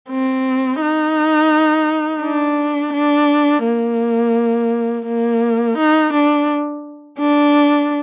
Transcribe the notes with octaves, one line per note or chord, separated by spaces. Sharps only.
C4
D#4
D4
D4
A#3
A#3
D#4
D4
D4